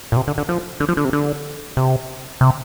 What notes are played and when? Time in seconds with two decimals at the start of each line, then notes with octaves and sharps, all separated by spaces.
0.12 A#2
0.17 C3
0.27 D3
0.38 D3
0.49 F3
0.80 D3
0.88 F3
0.97 D3
1.05 C3
1.13 D3
1.77 C3
2.41 C3